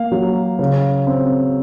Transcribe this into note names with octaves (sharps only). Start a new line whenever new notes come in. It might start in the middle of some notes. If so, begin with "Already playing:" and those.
Already playing: A#3 F5
F#3
C#3
C4